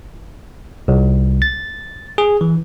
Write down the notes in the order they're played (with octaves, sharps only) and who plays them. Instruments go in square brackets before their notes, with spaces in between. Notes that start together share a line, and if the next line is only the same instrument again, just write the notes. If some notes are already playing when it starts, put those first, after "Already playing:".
[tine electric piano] C2
A6
G#4
E3